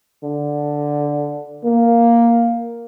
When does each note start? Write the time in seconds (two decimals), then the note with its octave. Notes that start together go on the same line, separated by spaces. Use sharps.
0.23 D3
1.64 A#3